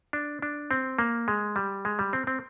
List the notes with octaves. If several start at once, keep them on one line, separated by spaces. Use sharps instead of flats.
D4
D4
C4
A#3
G#3
G3
G#3
G3
C4
C4